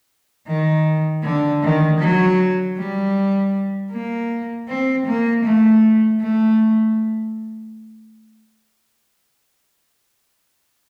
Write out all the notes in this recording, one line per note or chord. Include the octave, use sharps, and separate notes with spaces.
D#3
D3
D#3
F#3
G3
A#3
C4
A#3
A3
A3